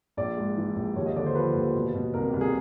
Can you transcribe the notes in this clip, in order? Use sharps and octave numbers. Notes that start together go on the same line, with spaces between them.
A#1 D5
G#2
E3
A#1
D#2 C#5
D#5
D3 D5
C5
F3 B4
D#2
B2
B2
C2 A#4
C2 G4
G#4